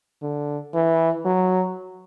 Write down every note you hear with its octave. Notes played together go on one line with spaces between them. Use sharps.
D3
E3
F#3